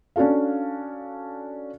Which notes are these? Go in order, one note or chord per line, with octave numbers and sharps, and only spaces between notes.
C#4 D4 F#4 A4 F5